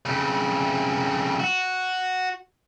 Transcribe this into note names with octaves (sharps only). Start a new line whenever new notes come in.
F2 C#3
F#4